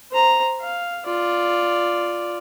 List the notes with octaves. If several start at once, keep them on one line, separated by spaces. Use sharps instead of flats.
C5 A#5
F5
F4 D5